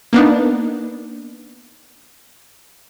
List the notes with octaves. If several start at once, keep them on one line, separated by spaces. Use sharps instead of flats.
A#3 B3 D4 D#4